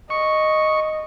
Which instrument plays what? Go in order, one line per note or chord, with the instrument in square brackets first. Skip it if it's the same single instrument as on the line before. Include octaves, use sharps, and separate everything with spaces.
[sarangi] D#5 [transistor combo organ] C#6